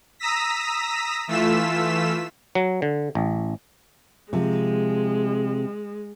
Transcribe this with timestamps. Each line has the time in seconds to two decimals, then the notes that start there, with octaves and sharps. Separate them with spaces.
0.19 A#5 D#6 E6 A#6 B6
1.28 E3 A3 F4 E6 B6 E7
2.55 F#3
2.82 D3
3.15 A1
4.33 C3 F3 G#3